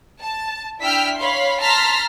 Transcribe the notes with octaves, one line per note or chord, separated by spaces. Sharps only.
A5
D4 E4 G5 E6 F6 B6
C#5 F5 B5 C6
A5 A#5 C6 F6 A6 B6